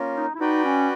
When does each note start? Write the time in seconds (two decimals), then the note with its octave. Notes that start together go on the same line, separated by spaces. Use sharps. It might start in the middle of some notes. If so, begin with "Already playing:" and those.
Already playing: A#3 C#4 F4 A#4
0.16 D#4
0.35 E4
0.40 D#4 F#4 B4 D5 G5
0.64 C#4